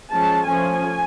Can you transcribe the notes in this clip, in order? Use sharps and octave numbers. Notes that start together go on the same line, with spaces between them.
F3 G#3 C#4 A5
F3 A3 C#4 G#5